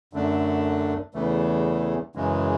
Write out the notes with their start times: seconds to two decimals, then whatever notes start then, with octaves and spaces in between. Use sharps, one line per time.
0.13 F#2 D3 A3 D4
1.14 E2 C#3 E3 A3
2.15 F#2 C#3 E3 G#3